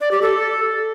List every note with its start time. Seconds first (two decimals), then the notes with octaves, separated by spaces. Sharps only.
0.01 D5
0.11 G4
0.22 A4